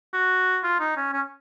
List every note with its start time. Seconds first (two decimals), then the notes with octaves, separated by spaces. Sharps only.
0.13 F#4
0.63 F4
0.80 D#4
0.97 C#4
1.13 C#4